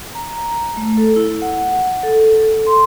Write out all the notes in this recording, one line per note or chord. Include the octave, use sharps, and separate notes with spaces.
A#5
A3
A4
E4
F#5
A4
A4
C6